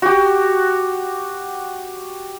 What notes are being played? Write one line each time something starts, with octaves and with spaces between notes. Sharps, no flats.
F#4 G4